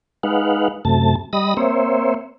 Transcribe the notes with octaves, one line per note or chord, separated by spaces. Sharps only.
G#3 D#4 B4 F5 F#5
F#2 C3 A3 A5
G3 D#5 B5 D#6 A#6
A#3 C4 C5 C#5 E5